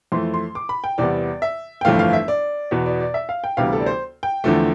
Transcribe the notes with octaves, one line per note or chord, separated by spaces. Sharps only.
F2 E3 A3 C6
C6
D6
B5
G5
E2 C3 G3 B3 D5
E5
G5
G1 F2 E3 A3 F5
F5
E5
D5
E2 B2 B3
D5
D5
E5
F5
G5
D2 C3 E3 G3 B3 F5
A4
D5
C5
G5
E2 D3 F3 A3